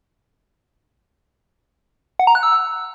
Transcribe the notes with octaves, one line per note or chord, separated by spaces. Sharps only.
F#5
A#5
F#6
E6